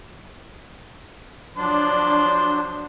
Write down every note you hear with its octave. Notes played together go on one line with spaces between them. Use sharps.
F3 F#3 D4 C5 D5